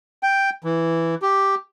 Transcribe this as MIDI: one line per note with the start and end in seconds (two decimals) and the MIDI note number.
0.23 0.50 79
0.64 1.15 52
1.22 1.55 67